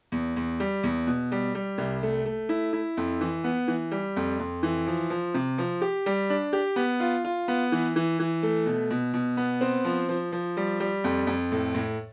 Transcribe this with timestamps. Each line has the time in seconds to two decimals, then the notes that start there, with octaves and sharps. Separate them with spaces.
0.12 E2
0.36 E2
0.60 G3
0.83 E2
1.07 B2
1.32 G3
1.55 G3
1.78 C2
2.03 A3
2.26 A3
2.49 E4
2.73 E4
2.97 F2
3.21 E3
3.44 B3
3.68 E3
3.92 G3
4.16 F2
4.40 F2
4.63 E3
4.87 F3
5.10 F3
5.34 C3
5.58 F3
5.81 G4
6.06 G3
6.30 D4
6.53 G4
6.76 B3
7.00 F4
7.25 F4
7.48 B3
7.72 E3
7.96 E3
8.20 E3
8.43 A3
8.66 B2
8.91 B2
9.14 B2
9.37 B3
9.61 C4
9.85 F3
10.09 F3
10.32 F3
10.57 G3
10.80 G3
11.04 F2
11.27 F2
11.52 A2
11.74 A2